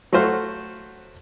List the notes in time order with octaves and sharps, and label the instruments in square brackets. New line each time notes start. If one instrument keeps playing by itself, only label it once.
[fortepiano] F#3 A3 F#4 C5 F5